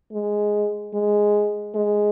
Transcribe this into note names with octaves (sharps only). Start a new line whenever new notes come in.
G#3
G#3
G#3